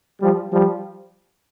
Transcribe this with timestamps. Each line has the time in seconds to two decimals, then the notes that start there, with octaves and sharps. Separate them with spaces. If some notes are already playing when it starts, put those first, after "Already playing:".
0.21 F3 G3
0.51 F3 G3